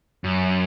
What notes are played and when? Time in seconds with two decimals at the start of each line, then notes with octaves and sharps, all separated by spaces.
0.24 F#2